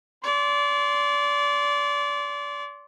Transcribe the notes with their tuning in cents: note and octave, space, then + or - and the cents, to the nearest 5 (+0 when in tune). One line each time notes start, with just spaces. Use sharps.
D5 -30 C6 +0